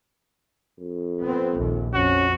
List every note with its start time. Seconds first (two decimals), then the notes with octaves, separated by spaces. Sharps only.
0.80 F2
1.22 B3 C4
1.58 A#1 D#2
1.94 F2 C#4 F#4